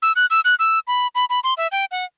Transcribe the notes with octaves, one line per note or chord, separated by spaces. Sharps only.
E6
F#6
E6
F#6
E6
B5
B5
B5
C6
E5
G5
F#5